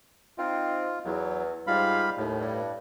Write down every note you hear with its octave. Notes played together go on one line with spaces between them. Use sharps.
C4 D#4 F4
E2 F#3
G#2 G3 F4 F5 B5
D#2 A2
G2